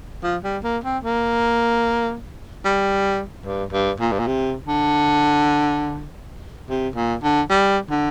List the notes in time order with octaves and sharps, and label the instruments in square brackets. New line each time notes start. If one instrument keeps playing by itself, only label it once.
[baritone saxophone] F3
G3
A#3
C4
A#3
G3
G2
G2
A#2
G2
A#2
C3
D3
C3
A#2
D3
G3
D3